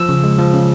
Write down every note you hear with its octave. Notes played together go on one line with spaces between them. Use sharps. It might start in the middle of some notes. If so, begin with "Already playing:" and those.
Already playing: F3 E6
C#3
G#3
F3
C#3